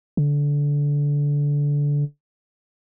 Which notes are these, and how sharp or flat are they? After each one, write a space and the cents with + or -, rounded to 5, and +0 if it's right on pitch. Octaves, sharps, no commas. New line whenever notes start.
D3 -20